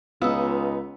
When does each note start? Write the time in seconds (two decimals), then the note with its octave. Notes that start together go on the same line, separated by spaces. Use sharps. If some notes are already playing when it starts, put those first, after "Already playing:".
0.22 C#2 B3 D#4 F4 D#6 E6